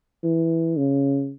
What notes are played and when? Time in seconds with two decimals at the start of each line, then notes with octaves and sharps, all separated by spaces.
0.24 E3
0.77 C#3